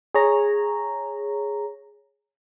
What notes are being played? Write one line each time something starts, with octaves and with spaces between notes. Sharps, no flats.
G#4 C#5 A#5